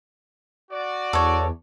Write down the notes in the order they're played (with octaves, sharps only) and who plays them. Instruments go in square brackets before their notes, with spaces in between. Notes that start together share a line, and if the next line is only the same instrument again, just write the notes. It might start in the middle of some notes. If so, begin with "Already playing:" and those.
[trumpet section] F#4 D5
[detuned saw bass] E2 [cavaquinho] A4 C#5